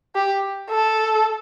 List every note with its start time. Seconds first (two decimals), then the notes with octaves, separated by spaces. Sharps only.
0.15 G4
0.70 A4